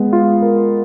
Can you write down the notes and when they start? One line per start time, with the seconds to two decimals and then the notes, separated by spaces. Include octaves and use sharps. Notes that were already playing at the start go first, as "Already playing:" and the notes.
Already playing: G#3 B3
0.13 F4
0.42 A#4